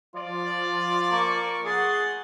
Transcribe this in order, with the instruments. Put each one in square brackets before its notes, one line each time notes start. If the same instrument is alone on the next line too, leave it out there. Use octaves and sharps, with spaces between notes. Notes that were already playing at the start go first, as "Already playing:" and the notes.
[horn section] F3 D5 [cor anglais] F4
[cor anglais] A#3 [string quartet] A#4 C#6
[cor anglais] G#4 [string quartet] F#5 C6 A6